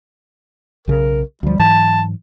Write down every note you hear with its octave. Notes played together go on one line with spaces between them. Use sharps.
B1 C#3 A#4
D2 F3 G3
G#2 E3 F#3 A5